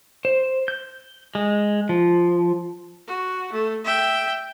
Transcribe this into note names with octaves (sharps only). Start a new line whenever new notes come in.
C5
G6
G#3
F3
F#4
A3
E5 G5